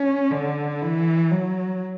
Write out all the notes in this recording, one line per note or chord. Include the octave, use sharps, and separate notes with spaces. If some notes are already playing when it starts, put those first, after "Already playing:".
Already playing: C#4
D3
E3
F#3